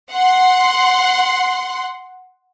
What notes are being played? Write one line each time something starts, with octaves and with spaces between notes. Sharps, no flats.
F#5 C6